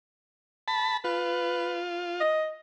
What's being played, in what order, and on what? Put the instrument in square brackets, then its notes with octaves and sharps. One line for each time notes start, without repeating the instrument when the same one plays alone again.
[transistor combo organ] A5 B5
[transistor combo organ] F4 [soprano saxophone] B4
[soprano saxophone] D#5